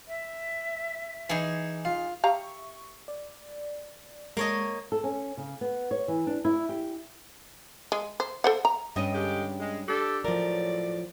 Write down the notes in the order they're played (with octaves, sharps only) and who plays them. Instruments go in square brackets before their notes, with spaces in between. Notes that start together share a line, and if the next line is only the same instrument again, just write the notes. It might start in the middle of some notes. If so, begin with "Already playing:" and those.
[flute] E5
[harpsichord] E3 [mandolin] D#4 G#4
[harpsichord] F4
[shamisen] G4 F5 A#5 [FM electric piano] E5 C#6
[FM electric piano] D5
[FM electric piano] G#3 A5 [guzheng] A#3 C#5 D#5
[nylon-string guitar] A4
C#4
C#3
B3
C#5
E3
D4
E4
G4
[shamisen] G#3
C5
A4 C5 F#5
A#5
[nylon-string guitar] G2 C#4 G5 [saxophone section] D#5
[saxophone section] D3 G#3 G4
G#3
D4 G4 A4
[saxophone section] A2 F#3 D5 [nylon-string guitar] F3 A#4